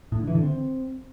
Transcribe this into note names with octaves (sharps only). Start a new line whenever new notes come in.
A2
D3
E3
D3
C4